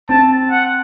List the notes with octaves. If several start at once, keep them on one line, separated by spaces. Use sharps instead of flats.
C4 A5
F#5